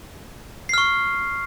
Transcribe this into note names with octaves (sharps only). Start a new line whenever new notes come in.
C#6 F6 C7